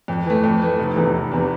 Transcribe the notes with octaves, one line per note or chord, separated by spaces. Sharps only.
F2
E3 A3
F2
E3 A3
F1
E2 C3 E3
F1
E2 C3 E3